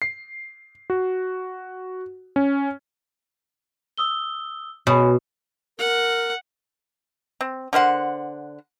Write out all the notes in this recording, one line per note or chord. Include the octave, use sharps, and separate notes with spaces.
C7
F#4
C#4
D#6 E6 G7
B2 C#5 G#5 B5
A#4 F#5
C4
D3 A#4 C5 F#5